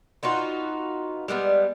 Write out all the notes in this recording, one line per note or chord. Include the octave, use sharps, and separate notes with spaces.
B3 D#4 F4 F#4
G3 G#3 A#3 B3